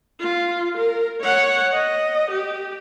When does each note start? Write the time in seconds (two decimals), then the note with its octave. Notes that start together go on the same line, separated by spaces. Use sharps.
0.20 F4
0.77 A#4
1.21 C#5 F#5
1.73 D#5
2.31 G4